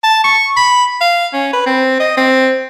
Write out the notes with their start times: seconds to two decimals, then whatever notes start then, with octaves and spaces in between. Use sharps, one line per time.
0.03 A5
0.24 C#6
0.57 B5
1.01 F5
1.33 C#4
1.53 B4
1.66 C4
2.00 D#5
2.17 C4